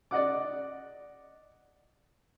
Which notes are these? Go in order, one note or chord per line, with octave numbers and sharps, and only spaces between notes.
D5 D#5 F#5 D6